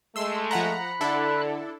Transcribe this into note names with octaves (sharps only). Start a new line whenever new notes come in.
G#3 A3 C6 E6
F3 F#5 A#5 B5 F#6
D3 D4 E4 A4